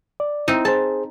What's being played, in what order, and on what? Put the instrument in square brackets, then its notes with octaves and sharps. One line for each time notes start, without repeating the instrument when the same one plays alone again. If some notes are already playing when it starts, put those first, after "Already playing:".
[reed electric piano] D5
[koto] C4 D#4 [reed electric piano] E4
[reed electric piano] G#4 C5 [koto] A5